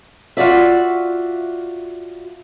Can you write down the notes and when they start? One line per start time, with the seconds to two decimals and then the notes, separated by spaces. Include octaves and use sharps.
0.37 F4 F#4 D5 E5